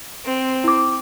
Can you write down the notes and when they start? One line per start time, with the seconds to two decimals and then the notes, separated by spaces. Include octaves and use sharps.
0.25 C4
0.64 E4 D6